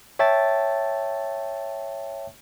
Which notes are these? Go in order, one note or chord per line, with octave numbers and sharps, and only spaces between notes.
C#5 E5 G5 A5 A6